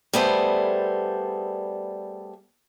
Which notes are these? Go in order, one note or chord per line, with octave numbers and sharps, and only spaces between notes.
G3 A3 B3 G#4 A4 C5